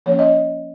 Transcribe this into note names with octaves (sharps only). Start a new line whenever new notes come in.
F3 A#3 C#4 C#5
D#5